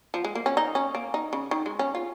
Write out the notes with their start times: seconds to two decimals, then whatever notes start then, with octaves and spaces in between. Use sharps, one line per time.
0.14 F3
0.25 G#3
0.35 A#3
0.46 C#4
0.57 D#4
0.75 C#4
0.95 A#3
1.14 D#4
1.33 C#3
1.51 D#3
1.66 G#3
1.79 C#4
1.95 F4